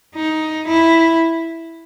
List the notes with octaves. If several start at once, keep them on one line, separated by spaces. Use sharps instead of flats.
D#4
E4